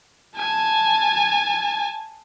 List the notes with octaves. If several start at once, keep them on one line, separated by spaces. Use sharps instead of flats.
G#5 A5